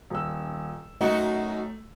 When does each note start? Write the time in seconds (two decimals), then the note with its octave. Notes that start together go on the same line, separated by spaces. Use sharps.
0.10 D#1 E6
1.01 F#2 A3 D#4 F#4